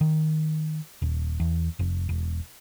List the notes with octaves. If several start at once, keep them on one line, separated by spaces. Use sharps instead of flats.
D#3
D#1
E2
F1
E1